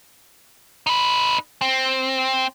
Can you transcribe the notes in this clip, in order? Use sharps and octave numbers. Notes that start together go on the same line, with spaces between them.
D#4 B4
C4